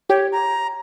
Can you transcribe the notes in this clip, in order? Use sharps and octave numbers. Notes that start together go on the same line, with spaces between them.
G4 C#5
A#5